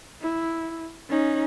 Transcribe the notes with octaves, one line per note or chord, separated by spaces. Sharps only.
E4
C#4 D#4